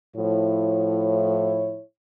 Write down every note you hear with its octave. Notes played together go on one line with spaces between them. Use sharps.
A2 F3 E4 C#5